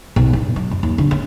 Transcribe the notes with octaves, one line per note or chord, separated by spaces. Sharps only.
B1
G2
F#3
F#2
D#2
D3
C#4